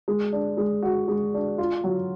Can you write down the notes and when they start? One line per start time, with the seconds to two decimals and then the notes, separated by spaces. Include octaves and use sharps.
0.08 G#3
0.32 D4
0.57 G#3
0.83 F#4
1.08 G#3
1.34 D4
1.58 F4
1.84 F#3